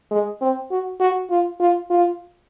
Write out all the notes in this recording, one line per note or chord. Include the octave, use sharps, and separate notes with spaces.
G#3
C4
F#4
F#4
F4
F4
F4